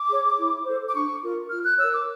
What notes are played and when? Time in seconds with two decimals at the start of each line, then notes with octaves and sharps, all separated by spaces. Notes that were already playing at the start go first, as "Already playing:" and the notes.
Already playing: D6
0.08 G#4 C#5
0.37 E4
0.66 A4 C5
0.87 D6
0.94 D4 C#6
1.22 F4 A#4
1.50 F4 F6
1.65 F#6
1.78 A#4 C#5 E6
1.93 D6